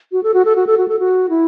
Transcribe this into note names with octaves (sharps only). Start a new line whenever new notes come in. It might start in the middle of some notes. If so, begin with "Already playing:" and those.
F#4
A4
F#4
A4
F#4
A4
F#4
A4
F#4
E4